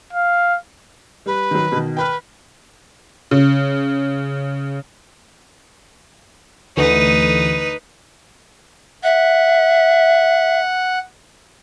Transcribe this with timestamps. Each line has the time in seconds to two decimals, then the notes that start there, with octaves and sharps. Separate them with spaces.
0.13 F5
1.26 G3 B4
1.51 D#3 F#3
1.72 B2 D#3
1.97 B4 G5 B5 F6
3.31 C#3
6.77 D2 D3 E3 D#4 B4
9.04 E5 F#5